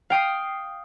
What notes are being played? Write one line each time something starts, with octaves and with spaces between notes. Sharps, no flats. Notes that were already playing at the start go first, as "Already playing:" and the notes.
F5 G5 D#6 C7